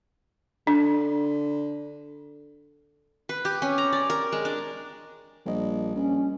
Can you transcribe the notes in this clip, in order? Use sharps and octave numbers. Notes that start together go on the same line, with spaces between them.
D3 D4
B4
G4
C#4
A#5
D5
A#4
G#3
D4
A#1 G3 D#5
A#1 C#4